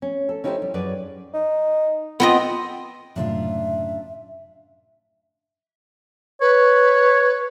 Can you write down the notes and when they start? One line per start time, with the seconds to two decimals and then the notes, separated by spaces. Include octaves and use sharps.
0.02 C#4
0.29 A4
0.44 C#4 D#4 E4 G4 G#4 C5
0.62 G3
0.74 F#2 G#4 B4 D5
1.34 D#4
2.20 B3 C4 F4 D#5
3.16 F#1 F#2 A2 C3 D4 F4 E5
6.41 B4 C#5